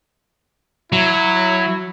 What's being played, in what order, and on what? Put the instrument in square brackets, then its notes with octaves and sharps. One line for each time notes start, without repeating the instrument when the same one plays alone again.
[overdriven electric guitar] F#3 [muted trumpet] E4